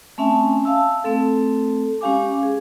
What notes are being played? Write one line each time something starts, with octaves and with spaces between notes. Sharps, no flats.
A3 C4 C#4 E5 G#5 A5
F5 A5 E6
A3 C4 A4
G#3 C#4 G4 F5 G#5 D6
G#4